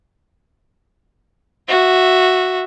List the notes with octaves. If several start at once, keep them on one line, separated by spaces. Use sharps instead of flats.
F#4 E5